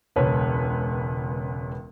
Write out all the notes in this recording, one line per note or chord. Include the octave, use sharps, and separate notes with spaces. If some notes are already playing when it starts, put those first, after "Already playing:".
E1 C#2 B4 C#5